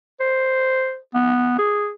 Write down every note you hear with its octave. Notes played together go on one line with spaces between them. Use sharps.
C5
B3
G#4